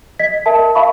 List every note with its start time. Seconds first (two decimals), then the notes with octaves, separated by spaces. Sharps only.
0.19 D#5 G#6 B6
0.46 A#4 E5 A5
0.75 E5 F5 A5 B5 C#6